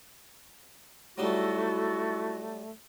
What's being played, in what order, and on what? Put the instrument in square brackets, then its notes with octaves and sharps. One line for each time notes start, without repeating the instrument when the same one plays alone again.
[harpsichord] F#3 G3 D#4 [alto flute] A3 [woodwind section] E4 F#4